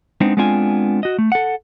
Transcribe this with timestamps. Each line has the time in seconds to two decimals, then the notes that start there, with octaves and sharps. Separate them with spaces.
0.21 G#3 B3 C4 D4 D#4
0.37 G#3 B3 C4 D4 F4 G#5
1.03 F#4 D#5
1.19 A3
1.32 A4 F#5